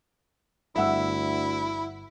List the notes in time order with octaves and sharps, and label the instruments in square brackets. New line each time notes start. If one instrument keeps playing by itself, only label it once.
[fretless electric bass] G1 G2 [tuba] D2 [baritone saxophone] E4 [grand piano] E5 F#5 E6